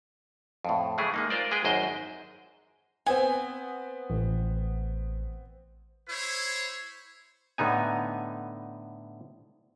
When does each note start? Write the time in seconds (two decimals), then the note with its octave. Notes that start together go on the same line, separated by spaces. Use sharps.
0.65 F2 A2
0.98 C#3 E3 G#3 A3 E4 G#4
1.14 G#3 A#3 D#4
1.30 F4 A#4 C5 D5
1.51 G#3 G#4 B4 G5
1.65 G#1 F#2 C5 D#5
3.06 B3 C4 G#5
4.10 A1
6.08 E4 C5 C#5
7.58 A2 D3 B3 D#4 G#5